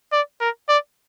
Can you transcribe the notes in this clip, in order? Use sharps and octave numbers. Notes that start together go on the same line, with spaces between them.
D5
A#4
D5